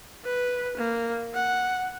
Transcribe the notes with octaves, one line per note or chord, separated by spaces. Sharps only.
B4
A#3
F#5